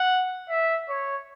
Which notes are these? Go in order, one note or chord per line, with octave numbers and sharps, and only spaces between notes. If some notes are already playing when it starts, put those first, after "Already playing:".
Already playing: F#5
E5
C#5